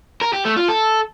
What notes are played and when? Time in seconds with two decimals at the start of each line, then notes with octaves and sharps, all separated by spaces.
0.21 A#4
0.33 G4
0.45 A3
0.57 F4
0.68 A4